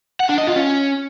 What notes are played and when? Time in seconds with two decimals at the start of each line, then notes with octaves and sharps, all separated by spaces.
0.20 F#5
0.29 D4
0.38 D#5
0.47 F4
0.56 C#4